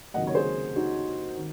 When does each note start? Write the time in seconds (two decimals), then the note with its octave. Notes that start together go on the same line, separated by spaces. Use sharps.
0.14 C#2 C3 D#3 F#3 A#3 D#5 F#5
0.27 C#5
0.35 G#4 C5
0.76 D#4 F#4
1.37 D#3